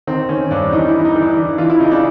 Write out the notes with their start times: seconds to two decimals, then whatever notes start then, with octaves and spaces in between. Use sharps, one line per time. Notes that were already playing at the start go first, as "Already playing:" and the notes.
0.07 D#3 C4
0.29 D#3 C#4
0.51 G2 D4
0.73 E3 D#4
0.88 E3 E4
1.05 D#4
1.15 E3
1.21 D4
1.37 E3
1.58 E3 F4
1.70 E4
1.80 C#3 D#4
1.91 D4